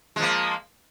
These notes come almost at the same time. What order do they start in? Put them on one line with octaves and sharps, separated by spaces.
G#3 F3 A#3